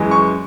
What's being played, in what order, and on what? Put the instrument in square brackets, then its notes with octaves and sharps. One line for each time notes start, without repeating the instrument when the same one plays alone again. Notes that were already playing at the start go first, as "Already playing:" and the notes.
Already playing: [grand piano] F#2 E3 G#3
C#6